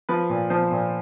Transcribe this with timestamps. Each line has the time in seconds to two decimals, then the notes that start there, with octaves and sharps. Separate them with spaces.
0.09 F3 B4
0.30 A#2
0.50 F3 C5
0.71 A#2